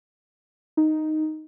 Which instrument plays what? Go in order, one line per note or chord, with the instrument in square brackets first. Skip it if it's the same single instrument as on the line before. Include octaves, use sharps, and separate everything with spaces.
[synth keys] D#4